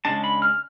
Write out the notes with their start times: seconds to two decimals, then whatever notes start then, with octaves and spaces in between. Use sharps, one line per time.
0.05 C#3 G#3 D4 A5
0.24 B5
0.42 F6